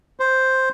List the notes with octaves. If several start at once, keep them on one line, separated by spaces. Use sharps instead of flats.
C5